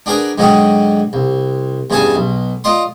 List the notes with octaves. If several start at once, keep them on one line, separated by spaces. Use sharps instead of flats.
D4 F#4 G#4 A#4 B4
G#2 D3 F#3 D#4 F#4 G4
C2
E2 G2 C#4 G#4 G#5 A5
B1
F4 D5 D#5 C6